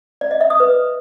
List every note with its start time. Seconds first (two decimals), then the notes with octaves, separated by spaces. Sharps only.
0.21 D5
0.31 D#5
0.41 E5
0.50 D#6
0.60 B4